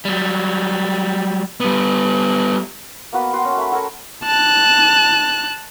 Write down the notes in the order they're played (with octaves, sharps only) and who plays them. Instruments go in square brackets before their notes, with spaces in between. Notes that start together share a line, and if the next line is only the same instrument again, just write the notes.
[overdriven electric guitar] F#3 G3
[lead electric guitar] G3 B3
[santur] A#3 B3 F#4 B4
F#4 G5 C6
C#4
A3 B5
F#4 A4 A#4 C#5
[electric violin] A5 F#6